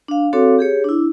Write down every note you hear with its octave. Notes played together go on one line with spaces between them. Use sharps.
D4 F5
C4 F#4 A4 C#5 F5 D6
G4 G#4 C#5
D4 E4